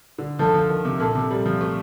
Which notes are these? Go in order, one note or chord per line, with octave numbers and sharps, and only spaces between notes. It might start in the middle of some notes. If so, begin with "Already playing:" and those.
D3
F3 A4
F3
D#3
C3
A#2 A4
C3
G3
F3
A3